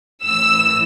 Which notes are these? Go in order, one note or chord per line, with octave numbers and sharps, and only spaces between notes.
A2 E3 E6